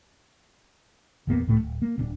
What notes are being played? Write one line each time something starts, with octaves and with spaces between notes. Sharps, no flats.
A#1 E2 A#3 B3
C#2 A2 A3
D1
A#3
D#1 A#2 D4